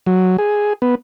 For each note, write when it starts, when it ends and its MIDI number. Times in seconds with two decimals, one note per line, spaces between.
0.06 0.37 54
0.38 0.73 68
0.82 0.95 59